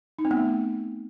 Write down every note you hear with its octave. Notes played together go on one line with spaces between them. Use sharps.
D#4
C4
B3
A3